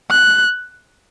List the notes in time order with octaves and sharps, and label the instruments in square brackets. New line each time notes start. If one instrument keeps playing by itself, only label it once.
[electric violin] F#6